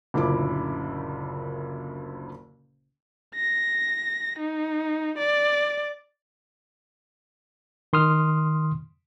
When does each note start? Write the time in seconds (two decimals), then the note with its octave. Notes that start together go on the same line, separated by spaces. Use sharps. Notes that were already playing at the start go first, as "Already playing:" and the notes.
0.14 F#1 D2 A#2 C#3 E4 D6
3.35 A#6
4.39 D#4
5.18 D5
7.93 D#3 C6 D#6 F6